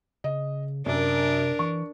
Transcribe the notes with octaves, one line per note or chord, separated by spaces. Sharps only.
C#3 D#5
F#2 C3 D4 A#4
E3 C#6